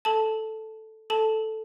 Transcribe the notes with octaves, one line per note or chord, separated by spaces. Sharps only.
A4 A5
A4 A5